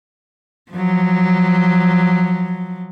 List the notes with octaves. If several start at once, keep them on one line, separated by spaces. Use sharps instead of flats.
F3 F#3